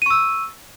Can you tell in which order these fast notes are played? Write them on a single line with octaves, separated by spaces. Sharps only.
D#7 C#6 E6